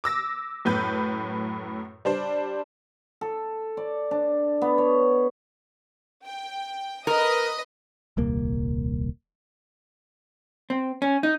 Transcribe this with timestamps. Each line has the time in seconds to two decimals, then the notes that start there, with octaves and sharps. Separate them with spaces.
0.04 D6 E6 A#6
0.65 F#2 A2 B4 G6
2.05 G3 D4 C5
3.21 A4
3.77 D5
4.11 D4
4.62 B3
4.78 C#5
6.25 G5
7.07 A#4 B4 D#5 D#6
8.17 D#1 C2 A#3
10.70 C4
11.02 C#4
11.23 D#4